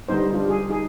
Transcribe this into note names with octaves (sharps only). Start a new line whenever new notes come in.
D3 G3 B3 D#4 C5
G3 D4 F4
G#4
D#4 G#4